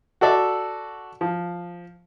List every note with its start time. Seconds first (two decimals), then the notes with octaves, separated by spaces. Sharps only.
0.21 F#4 A4 D5 E5
1.21 F3